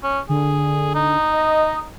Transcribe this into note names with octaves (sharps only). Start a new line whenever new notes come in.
C#4
D3 G#4
D#4
D#5